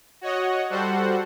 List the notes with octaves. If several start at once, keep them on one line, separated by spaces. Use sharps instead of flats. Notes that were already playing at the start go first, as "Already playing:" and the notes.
F#4 C#5 D#5 F#5
G3 F#4 A4 C5 F#5